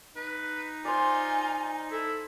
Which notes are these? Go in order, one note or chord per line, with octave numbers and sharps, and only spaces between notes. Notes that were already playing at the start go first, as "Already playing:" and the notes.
D#4 B4
F4 C5 D5 G#5
E4 A4